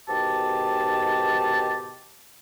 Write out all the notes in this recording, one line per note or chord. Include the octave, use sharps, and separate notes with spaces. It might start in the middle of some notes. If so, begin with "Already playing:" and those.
G#2 B2 D#3 G4 A5